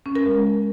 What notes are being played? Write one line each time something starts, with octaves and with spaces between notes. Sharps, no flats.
C#4
A#4
G#3